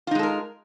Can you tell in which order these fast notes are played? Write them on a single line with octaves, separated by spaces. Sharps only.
F4 D#4 G#3 A4 A#4